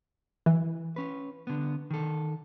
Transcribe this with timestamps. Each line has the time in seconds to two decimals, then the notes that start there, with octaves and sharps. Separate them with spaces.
0.46 E3
0.96 C#4 B4
1.47 D3 B3
1.90 D#3 A4